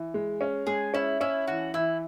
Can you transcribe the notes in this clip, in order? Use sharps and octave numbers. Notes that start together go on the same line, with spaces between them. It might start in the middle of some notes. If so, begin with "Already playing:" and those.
Already playing: E3
G#3
C#4
G#3 G#4
C#4 E4
C#4 E4
E3 F#4
E3 E4